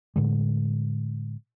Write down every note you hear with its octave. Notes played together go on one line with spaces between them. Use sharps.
A2 D3 G#3